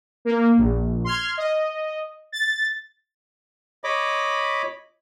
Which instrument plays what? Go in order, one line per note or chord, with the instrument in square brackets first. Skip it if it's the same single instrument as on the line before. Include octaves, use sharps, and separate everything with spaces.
[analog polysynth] A#3
A#1
C6 F6 G#6
D#5
A6
[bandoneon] C#5 D#5 B5 D6